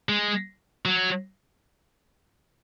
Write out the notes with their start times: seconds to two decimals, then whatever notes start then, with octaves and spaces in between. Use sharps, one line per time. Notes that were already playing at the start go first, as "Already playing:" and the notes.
0.09 G#3
0.86 F#3